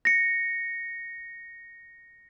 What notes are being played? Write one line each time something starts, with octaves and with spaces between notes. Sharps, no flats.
A#6 C#7